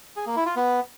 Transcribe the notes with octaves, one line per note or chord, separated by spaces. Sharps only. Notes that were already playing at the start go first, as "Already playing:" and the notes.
G#4
A#3
E4
F4
B3